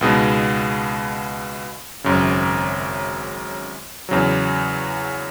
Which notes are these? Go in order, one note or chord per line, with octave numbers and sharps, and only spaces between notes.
C#2 B2 G#3 B3 D#4
G#1 F#2 C#3
E2 C#3 F#3